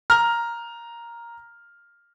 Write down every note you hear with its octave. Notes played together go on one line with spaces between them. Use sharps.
A#5 F6